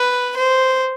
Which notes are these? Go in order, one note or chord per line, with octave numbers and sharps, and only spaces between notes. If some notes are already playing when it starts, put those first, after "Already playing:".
Already playing: B4
C5